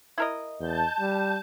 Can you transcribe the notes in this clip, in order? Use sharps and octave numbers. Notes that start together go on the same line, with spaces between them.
E4 A#4 D#5
E2 A5 G6
G3